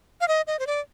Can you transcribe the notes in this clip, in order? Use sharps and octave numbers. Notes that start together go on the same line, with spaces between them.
F5
D#5
D#5
C5
D5